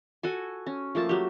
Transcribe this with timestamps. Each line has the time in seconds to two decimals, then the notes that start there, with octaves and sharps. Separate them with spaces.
0.23 F#4 A4 G#5
0.67 C#4
0.95 F3 A3 A#3 A5
1.09 F#3 G4